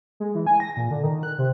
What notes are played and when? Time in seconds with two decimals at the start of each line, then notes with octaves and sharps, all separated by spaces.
0.20 G#3
0.35 E3
0.47 G#5
0.60 A#6
0.77 A#2
0.91 D3
1.03 D#3
1.23 F#6
1.38 C3